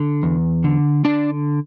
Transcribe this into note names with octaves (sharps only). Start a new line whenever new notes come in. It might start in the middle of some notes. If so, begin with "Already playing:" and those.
Already playing: D3
E2
D3
D3 D4 D5